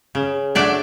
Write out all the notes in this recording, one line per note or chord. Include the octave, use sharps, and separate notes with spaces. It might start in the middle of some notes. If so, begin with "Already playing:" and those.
C#3
F#3 A3 D4 D5